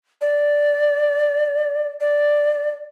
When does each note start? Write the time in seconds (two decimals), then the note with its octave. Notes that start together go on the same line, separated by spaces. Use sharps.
0.21 D5
2.01 D5